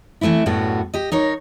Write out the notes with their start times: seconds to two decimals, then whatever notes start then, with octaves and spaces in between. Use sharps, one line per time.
0.21 E3 G3 A3 C4 E4
0.46 F#2 A2 G3 B3 F#4
0.94 G4 D#5
1.12 D#4 A#4 C#5